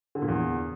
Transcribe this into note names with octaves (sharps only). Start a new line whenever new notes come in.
D3
A#2
E2